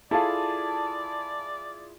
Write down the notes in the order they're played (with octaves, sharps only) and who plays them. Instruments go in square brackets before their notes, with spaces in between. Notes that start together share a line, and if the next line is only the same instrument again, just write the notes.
[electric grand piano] E4 F4 G#4 [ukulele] A4 F5 [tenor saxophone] D5 [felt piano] A5